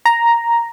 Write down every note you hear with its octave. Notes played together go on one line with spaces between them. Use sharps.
A#5